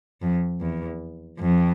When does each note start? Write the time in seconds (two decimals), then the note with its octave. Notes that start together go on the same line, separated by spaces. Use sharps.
0.21 F2
0.61 E2
1.39 F2